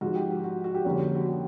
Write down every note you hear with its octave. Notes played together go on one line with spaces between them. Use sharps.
G#2 F3 G#3 F#4
G4
F#4
F#4
G4
F2 D3 G3 A#3 C#4
F#4
G4